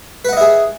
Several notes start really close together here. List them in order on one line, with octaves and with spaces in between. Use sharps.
B4 F#5 D#5 E4 G#4